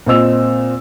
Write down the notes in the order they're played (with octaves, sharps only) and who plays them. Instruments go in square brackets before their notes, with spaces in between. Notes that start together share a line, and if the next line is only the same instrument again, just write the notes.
[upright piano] A#2 C4 D#5 E6 F7